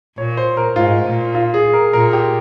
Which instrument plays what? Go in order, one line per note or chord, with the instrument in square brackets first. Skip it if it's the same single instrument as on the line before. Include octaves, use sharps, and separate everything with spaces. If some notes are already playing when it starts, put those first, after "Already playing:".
[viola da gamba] A#2 [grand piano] C#5
[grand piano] C5
A#4
[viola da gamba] G#2 [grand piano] F4
[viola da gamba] A#2
[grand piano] F4
G#4
A#4
[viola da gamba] A#2 [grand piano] A#4
[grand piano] G4